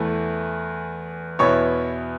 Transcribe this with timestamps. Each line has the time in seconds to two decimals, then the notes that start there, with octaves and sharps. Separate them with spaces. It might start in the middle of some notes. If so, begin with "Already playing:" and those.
Already playing: E2 E3 A3
1.39 E2 B2 B3 E4 C#5 C#6